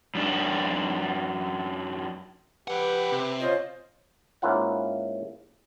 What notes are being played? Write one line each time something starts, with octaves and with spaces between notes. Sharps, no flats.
F#2 D4
F3 G4 B4 F#5
C3
C#4 F4 C5 D#5
G#2 A#3 C#4 E4 F4 F#5